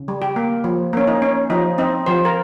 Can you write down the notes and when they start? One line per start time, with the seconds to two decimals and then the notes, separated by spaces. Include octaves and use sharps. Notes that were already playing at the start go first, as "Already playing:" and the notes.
Already playing: C#3
0.08 G3
0.22 G4
0.36 A#3
0.64 F3
0.93 A#3 C#4
1.07 D#4
1.22 C#4
1.50 F3 D#4
1.78 C4 D#4
2.06 F3 C5
2.25 A#4